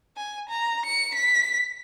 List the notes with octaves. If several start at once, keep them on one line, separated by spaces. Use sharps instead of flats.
G#5
A#5
C#7
B6